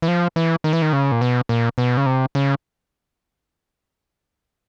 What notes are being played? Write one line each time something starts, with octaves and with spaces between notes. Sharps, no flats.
E3
F3
E3
D#3
E3
D#3
C#3
A#2
B2
A#2
B2
C#3
C3
C#3